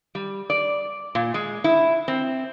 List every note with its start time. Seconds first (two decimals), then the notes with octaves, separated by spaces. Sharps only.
0.15 G3
0.50 D5
1.15 A#2
1.34 G#3
1.64 E4
2.08 C4